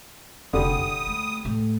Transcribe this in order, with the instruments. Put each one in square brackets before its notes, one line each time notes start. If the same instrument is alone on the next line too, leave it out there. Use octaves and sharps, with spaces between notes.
[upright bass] F1 [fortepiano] D3 G3 [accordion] D#6
[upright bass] A#1
A3
A2 A3